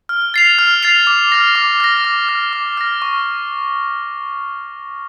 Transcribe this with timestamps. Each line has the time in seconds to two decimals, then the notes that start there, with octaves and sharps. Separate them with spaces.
0.09 F6
0.34 A6 C7 F7
0.59 F6
0.83 A6 C7 F7
1.07 D6
1.32 F6 A#6
1.55 D6
1.80 F6 A#6
2.04 D6
2.29 F6 A#6
2.53 D6
2.77 F6 A#6
3.02 C#6